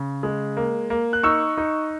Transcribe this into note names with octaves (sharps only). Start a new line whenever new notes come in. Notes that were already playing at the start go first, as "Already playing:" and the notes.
Already playing: C#3
G#3
A#3
A#3
F#6
D#4 C#6 E6
D#4